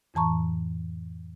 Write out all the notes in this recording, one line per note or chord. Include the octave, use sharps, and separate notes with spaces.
F2 A2 E3 A5 A#5 C#6